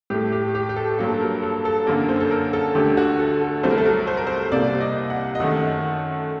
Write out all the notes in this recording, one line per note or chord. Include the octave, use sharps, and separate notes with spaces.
A2 A3 G4
G4
G4
G4
A4
G2 F#3 A#3 A4
A#4
A4
A4
F#2 D3 F#3 A#3 A#4
C5
A4
A#4
A4
D2 D3 A3 G4
F#4
A4
A4
C2 C3 F#3 A3 C5
A#4
A4
A#4
C5
A#4
C5
C2 C3 G3 A#3 D5
D#5
F#5
D#5
F#2 D#3 A3 F#5